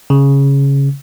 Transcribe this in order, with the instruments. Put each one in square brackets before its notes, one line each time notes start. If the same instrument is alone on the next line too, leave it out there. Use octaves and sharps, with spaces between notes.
[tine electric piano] C#3